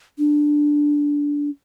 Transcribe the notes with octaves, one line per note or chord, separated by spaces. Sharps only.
D4